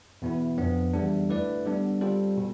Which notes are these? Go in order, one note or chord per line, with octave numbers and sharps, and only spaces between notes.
E2 B2 B3 E4
F2 D3 F3 B3 D4
E2 D3 G3 D4
D3 A3 E4 B4 D5
D3 G3 B3 D4
G3 C4 F4 A4
B2